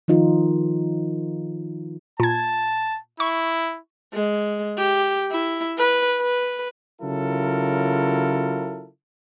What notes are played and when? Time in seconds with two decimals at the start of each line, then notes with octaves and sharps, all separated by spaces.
0.08 D#3 F3 D#4 F4
2.20 A#2 A5 G#6
3.20 E4 C#6
4.14 G#3
4.78 G4
5.31 E4
5.78 B4
6.21 B4
7.01 C#3 F#3 E4 F4 A4 A#4